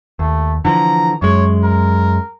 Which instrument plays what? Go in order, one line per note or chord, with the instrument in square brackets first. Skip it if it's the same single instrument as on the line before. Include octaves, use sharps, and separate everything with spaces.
[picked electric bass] D#2 [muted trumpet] A3
[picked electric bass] D3 E3 F3 [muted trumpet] A#5
[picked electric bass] F#2 G#3 [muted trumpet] C#5
[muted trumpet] A#4